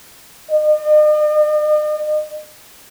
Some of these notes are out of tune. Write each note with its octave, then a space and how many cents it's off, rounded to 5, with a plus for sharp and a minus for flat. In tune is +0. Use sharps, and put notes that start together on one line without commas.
D#5 -45